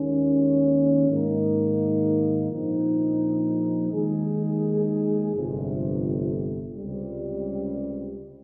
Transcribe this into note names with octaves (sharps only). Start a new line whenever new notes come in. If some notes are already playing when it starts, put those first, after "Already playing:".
Already playing: D#2 D#3 G#3 C#4
G#2 D#3 A#3 D#4
A#1 A#2 F3 C4 D#4
D#2 D#3 G#3 D#4 G#4
G1 F2 C3
C#2 C3 G3